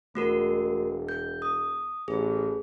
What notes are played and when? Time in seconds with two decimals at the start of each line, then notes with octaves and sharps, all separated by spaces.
0.15 E1 A3 F#4 A#4
1.09 G6
1.42 D#6
2.08 A1 G#4